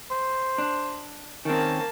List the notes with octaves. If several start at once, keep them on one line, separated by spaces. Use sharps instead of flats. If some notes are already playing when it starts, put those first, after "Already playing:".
C5
D4
D#3 A#3 C4 C#4 A5